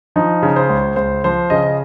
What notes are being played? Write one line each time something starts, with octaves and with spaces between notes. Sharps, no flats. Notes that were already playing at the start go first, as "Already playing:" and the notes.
F3 D#4
C#3
C5
C#2
C#2 C5
F3 C5
C#3 D#5